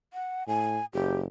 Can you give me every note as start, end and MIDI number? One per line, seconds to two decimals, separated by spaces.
0.13 0.44 78
0.48 0.78 45
0.48 0.85 80
0.93 1.26 30
0.93 1.19 67